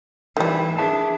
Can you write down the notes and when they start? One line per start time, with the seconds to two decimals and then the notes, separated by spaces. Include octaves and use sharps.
0.37 D#3 E3 G3
0.78 D4 G#4 E5 A5